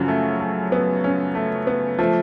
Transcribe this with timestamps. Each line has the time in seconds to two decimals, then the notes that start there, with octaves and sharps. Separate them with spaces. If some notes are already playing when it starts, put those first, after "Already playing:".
Already playing: F#2 C#3 F3 C#4 F#4
0.08 A3
0.40 A3
0.72 B3
1.04 C#4
1.35 A3
1.67 B3
1.99 F3 A3